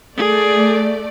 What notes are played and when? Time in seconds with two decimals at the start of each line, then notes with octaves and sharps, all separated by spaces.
0.17 A3 G#4 D5